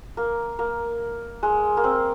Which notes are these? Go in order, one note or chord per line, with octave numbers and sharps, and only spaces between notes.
A#3
A#3
G#3
A#3
C4